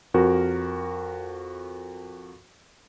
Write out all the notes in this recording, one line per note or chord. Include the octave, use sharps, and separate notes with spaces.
F2 F#4 A#4